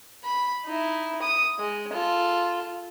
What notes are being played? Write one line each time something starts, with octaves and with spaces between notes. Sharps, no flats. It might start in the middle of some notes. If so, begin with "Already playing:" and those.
B5
D#4 E4
D#6
G#3
F4 A4